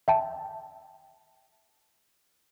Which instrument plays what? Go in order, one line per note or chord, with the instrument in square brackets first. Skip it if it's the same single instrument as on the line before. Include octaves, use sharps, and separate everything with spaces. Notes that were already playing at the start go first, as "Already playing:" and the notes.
[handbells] E5 G5 A5